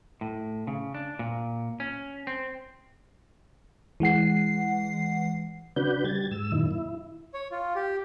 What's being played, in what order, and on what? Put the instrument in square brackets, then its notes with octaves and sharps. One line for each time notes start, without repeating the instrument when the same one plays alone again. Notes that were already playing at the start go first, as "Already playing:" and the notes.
[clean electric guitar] A2
C#3
D4
A#2
C#4
C4
[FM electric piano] E3 G#3 F#5 C7
[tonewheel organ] C#3 D4 F#4 B4 G6
G3 G#6 A6
G#2 E6
F#2 A#2 D#3 E4
E4
[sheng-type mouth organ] C#5
F4
G4